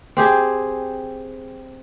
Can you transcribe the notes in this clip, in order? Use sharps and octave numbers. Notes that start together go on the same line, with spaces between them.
C4 G4 G#4